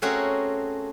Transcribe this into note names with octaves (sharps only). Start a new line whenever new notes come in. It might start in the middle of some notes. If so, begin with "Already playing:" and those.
A3 C4 C#4 F#4 G#4 A#4